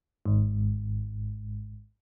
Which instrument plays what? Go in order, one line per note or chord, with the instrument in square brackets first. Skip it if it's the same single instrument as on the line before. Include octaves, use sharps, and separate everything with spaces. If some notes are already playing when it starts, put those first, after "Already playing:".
[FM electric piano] G#1 G#2